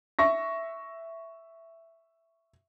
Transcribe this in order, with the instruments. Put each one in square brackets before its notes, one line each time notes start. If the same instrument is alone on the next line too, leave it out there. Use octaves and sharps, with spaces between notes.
[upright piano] E5 C#6 A#6